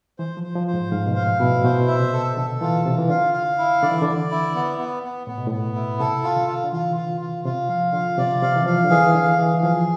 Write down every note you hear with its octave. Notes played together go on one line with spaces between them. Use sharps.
E3 C5
F3
C5
F3
C5
G#2
G#2 F5
B2
A2 F5
B2 E4
A2
B2 C5
E5
C3
A4
D3 A4
E3 F4
C3 F4
E3
D3 F5
F5
E4
D3 D5
E3
D3 D5
E4
B3
B3
B3
A2 B3
B2
A2 B3
E4
C3 A4
F4
D3
F4
D3
E3 F4
F4
F4
C3 F4
F3 F5
D3 F4
C3 D5
C3 F5
E3
F3 F5
D3
E3 G#4
E3
D3 F5
E3 G#4
E3
F3 G#4